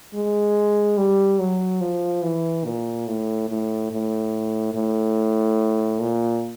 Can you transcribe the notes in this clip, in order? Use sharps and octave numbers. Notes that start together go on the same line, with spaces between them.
G#3
G3
F#3
F3
E3
A#2
A2
A2
A2
A2
A#2